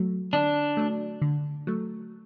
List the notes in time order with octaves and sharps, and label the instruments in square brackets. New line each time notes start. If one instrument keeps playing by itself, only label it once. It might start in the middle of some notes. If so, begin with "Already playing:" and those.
Already playing: [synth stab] F#3 A3
[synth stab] D3 [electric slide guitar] D4
[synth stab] F#3 A3
D3
F#3 A3